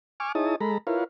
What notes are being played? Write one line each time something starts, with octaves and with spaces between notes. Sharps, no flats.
G#5 C#6 D6 F6
D#4 E4 G#4 C#5 A5 D#6
G#3 A4 A#5 B5
E4 F4 A#4 B4 C#5 F5